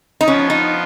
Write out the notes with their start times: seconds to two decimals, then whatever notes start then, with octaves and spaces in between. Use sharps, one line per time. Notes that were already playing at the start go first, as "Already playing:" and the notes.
0.21 D#4
0.28 F3 B3 C#4 F4
0.50 D#4